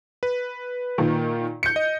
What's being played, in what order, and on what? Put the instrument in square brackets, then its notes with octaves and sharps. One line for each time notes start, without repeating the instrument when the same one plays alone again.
[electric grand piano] B4
[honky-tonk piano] A#2 D#3
G6 C#7
[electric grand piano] D#5